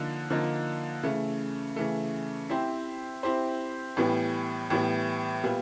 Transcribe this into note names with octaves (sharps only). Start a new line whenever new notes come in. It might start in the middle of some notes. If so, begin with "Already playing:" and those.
Already playing: D3 F3 A#3 D#4
D3 F3 A#3 D#4
C#3 E3 A3
C#3 E3 A3
C4 E4 G4 C5
C4 E4 G4 C5
A2 E3 G3 B3
A2 E3 G3 B3
A#2 G3 B3